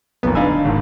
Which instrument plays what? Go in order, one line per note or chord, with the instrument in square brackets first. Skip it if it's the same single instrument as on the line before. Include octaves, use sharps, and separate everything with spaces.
[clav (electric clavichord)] B1 F2 A#2 [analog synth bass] B3
[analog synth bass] D1 [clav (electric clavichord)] D4 D#4 G#5 [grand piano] F5 B5 E6
[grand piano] G#1 G#2